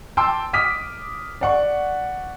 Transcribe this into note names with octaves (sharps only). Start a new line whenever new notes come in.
G5 A5 C6 D6 E6
D6 D#6 F6 B6
D5 F#5 C#6